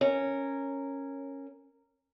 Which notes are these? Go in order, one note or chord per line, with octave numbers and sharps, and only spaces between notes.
C#4 A#4